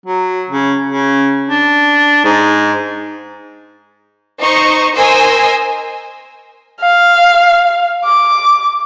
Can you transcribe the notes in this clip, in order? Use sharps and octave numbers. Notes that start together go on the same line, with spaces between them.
F#3
C#3
C#3
D4
G#2
D#4 C5 D#5 C#6
A#4 C5 D#5 G#5 C6 E6
F5
D6